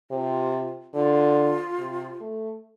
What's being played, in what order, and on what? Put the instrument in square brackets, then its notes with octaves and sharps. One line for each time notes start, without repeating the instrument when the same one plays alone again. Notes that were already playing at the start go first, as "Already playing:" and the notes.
[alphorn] C3 [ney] F4
[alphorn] D3 [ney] F4
[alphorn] C3
A3